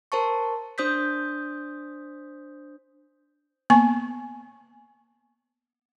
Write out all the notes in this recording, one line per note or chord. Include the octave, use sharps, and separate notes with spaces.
A#4 C5 A5 C#6
D4 C5 D#6 G6 B6
A#3 B3 G#5 C#6